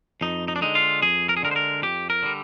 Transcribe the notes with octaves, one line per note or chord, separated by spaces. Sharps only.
F2 D#4
D#4
D4
D3 G#3 D#4
F4
F2 G#4
A#4
G#4
D3 G#3 A#4
C5
A#4
F2 G4
A#4
D3 G3